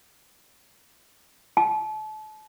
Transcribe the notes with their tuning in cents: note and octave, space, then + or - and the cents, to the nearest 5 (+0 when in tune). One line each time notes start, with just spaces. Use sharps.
A5 -35